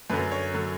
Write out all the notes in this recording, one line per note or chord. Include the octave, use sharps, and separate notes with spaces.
F#2 D3 F#3 B4
C#5
D3 F#3